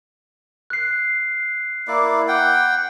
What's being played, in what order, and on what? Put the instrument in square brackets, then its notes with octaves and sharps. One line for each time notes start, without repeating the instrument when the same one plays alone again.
[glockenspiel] F#6 C7
[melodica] A#3 E4 D5
F#5 G5